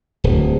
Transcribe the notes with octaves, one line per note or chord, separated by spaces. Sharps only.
D1